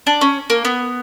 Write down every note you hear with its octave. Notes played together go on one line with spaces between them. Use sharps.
D4
C#4
A#3
B3